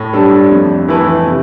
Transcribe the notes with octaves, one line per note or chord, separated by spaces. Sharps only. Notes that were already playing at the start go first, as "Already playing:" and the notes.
Already playing: A2
G3 D4 A4
F2
E3 A3 E4 B4
C3